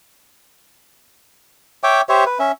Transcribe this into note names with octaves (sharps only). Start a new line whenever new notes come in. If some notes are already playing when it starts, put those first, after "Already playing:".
C#5 E5 G5 D6
G4 C5 C#5 E5
B4
C#4 E5